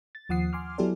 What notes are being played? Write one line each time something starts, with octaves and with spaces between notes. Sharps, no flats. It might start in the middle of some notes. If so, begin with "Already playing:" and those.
A6
D#2 F3 F#5 D#6 C7
G#5 C6 D6 F6
F#3 B3 E4 G4 A4 D5